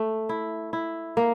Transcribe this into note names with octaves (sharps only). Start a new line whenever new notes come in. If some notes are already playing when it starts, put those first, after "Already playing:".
Already playing: A3
E4
E4
A#3